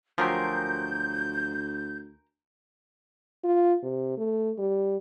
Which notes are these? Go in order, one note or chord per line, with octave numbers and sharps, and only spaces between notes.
D2 F3 F#3 G4 A#4 G#5 C6 G6
F4
C3
A3
G3